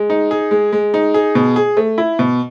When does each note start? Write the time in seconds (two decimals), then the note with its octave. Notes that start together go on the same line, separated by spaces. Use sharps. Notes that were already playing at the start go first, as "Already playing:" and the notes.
Already playing: G#3
0.10 D#4
0.31 G#4
0.51 G#3
0.73 G#3
0.94 D#4
1.14 G#4
1.35 B2
1.56 G#4
1.77 A3
1.98 E4
2.19 B2